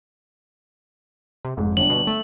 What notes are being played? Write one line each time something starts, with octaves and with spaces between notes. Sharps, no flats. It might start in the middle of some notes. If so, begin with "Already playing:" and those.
C3
F1 G#2
G1 D4 F#7
B2
A3